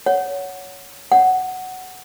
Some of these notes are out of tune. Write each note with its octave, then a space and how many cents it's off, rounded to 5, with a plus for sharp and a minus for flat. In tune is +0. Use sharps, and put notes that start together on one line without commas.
C#5 +15 F#5 +0
C#5 +35 F#5 +5